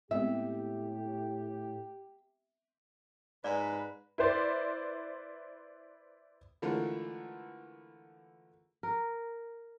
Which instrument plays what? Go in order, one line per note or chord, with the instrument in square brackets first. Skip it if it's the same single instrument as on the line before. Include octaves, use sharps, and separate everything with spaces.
[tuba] A2 [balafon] G#3 B3 C4 [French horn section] G4 [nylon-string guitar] E5
[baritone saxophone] G#2 [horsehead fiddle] B4 [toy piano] D5
[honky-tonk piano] E4 B4 C5 D5
[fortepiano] D3 E3 G#3 A3 F4 A#4
[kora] A#4